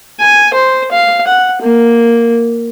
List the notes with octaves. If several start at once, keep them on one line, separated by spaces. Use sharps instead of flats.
G#5
C5
F5
F#5
A#3